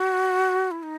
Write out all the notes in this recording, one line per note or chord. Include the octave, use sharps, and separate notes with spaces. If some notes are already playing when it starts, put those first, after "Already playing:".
Already playing: F#4
E4
D#4